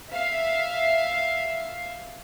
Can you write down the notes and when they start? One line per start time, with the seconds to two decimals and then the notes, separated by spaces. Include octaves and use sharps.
0.11 E5 F5